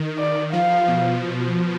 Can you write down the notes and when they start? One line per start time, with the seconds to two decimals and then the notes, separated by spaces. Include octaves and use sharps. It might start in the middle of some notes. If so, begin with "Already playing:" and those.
Already playing: D#3
0.18 D5
0.53 F3 F5
0.88 B2